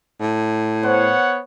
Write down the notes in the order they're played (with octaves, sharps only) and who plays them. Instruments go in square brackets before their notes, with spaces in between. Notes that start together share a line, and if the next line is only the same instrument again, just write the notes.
[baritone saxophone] A2
[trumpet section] B3 C#5 F#5 [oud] C5